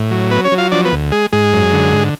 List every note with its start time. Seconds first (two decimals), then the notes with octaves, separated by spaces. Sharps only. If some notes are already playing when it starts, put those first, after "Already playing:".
Already playing: A2
0.11 F#3
0.31 B3 B4
0.45 C#4 C#5
0.52 F#3
0.58 F4 F5
0.71 F3 D4 D5
0.85 B3 B4
0.92 D2
1.12 G#3 G#4
1.32 G#2 G#3 G#4
1.53 F#2
1.73 D3
1.93 G#2